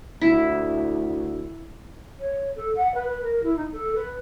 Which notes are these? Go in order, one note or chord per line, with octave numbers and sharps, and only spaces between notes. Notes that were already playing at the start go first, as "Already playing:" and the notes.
D2 E4
C#5
A4
F#5
B4
B4
A#4
E4
D#4
A4
B4